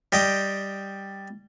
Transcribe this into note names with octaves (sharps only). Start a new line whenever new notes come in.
G3 D#5 G5